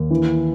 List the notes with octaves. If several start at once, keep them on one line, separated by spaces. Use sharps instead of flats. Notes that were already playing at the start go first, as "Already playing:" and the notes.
Already playing: D#2
E3